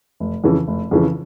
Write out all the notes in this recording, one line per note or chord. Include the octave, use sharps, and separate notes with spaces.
F1
F2 C#3 E3
F1
F2 C#3 E3